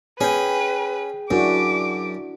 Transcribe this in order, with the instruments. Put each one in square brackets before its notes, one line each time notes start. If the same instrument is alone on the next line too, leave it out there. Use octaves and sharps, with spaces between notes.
[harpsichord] C#4 [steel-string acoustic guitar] G#4 G5 [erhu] B4
[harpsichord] F#2 [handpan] D4 E4 F#4 [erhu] D6